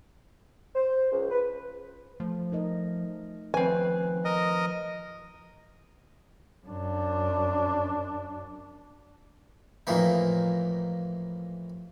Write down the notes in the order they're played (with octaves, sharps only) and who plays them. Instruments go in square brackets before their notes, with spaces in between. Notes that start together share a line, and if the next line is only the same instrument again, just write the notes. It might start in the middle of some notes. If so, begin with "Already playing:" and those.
[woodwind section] C5
C#2
B4
[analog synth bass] F3 [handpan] A3
[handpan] D#4 A#4 D#5
[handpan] D#3 B4 [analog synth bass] F3 [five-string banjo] C4 G#5
[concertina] A#4 D#5
[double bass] F#2 D4
[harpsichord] F2 A2 E3 A#3 D#4